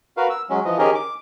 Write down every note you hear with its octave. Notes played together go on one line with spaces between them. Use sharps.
F#4 A#4 B4 F5
E6
F#3 G#3 C#4
E3 F3 D#5
D#3 C#4 G4 G#4 A#4 D#5
D6